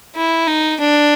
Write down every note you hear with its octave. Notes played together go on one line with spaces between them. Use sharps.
E4
D#4
D4